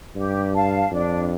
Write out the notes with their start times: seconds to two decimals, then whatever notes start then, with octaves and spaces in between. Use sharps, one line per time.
0.16 G2 G4
0.54 F5 A5
0.92 F2 D4